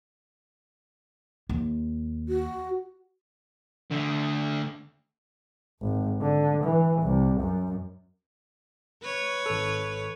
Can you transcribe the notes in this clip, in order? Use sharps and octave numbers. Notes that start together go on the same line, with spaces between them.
D#2
F#4
D2 D3
G#1
D3
E3
C2
F#2
B4 C#5
G#1 A4